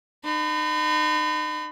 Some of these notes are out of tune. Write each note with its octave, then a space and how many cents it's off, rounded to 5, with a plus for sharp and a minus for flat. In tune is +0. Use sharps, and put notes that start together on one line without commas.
D#4 -35 B5 +30